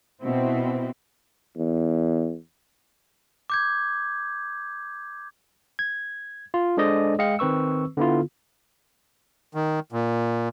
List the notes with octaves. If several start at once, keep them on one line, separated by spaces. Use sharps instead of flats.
B2 C4 E4
E2
D6 G6 G#6
G#6
F4
G#3 D4 A4 C5 D5 D#5
G#3 D#5 F5 G5 C#7
D#3 C4 B4 C#6 E6
D3 B3 E4 F4
D#3
A#2